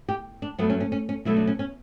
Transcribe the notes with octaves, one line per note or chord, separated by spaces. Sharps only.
G4
D4
G2 F#3 A3 B3
C#4
C#4
C#4
C#4
B2 F#3 A3 E4
D4
C#4
C#4